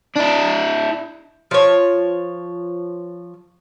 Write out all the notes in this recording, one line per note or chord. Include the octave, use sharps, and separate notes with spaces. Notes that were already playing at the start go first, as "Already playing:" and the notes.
D4 E4
F3 C#5